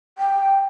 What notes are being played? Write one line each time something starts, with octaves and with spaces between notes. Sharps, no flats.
G5